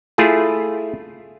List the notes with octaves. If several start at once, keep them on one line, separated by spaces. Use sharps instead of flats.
A3 E4 F4 G#4